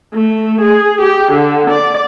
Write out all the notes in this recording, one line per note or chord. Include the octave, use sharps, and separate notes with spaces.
A3
G#4
G4
D3
D5